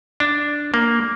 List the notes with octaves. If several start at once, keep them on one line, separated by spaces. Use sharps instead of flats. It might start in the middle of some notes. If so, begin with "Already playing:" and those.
D4
A#3